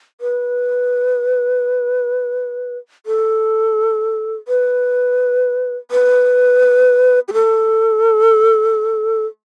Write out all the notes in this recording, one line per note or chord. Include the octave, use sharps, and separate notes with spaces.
B4
A4
B4
B4
G4
A4